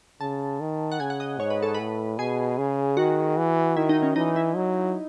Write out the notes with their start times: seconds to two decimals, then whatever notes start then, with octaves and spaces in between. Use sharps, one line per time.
0.20 C#3 A5
0.61 D#3
0.92 F#5
1.00 C#3 G#5
1.10 F#5
1.20 D#5
1.39 G#2 C#5
1.50 B4
1.62 A4
1.74 A2 B4
2.18 B2 G#4
2.58 C#3
2.97 D#3 F#4
3.37 E3
3.77 D#3 E4
3.89 D#4
4.03 C#4
4.16 E3 D#4
4.36 E4
4.56 F#3